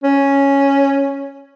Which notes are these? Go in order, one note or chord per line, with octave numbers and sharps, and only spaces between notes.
C#4